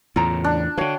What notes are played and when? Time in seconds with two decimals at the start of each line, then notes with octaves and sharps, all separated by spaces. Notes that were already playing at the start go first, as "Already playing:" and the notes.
0.16 E2 A2 C#3 F4 A#5
0.44 D4
0.78 D3 D#3 F#4 C#5 F5 G5